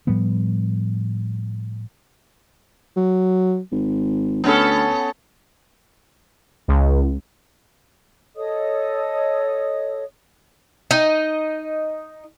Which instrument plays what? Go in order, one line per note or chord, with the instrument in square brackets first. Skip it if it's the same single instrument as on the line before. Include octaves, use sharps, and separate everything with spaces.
[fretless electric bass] A2 F3 G3 B3
[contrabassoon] F#3
G#1
[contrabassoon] D2 [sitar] B3 C#4 A4
[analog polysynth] C#2
[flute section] A4 C#5 D#5 D#6
[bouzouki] D#4 D#5